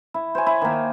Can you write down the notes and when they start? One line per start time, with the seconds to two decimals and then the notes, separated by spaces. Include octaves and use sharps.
0.14 E4
0.35 C5 C#5 G#5
0.46 E4
0.62 D#3 A#3